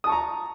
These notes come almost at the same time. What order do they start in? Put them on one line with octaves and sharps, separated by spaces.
D#6 A5 C#6 A#5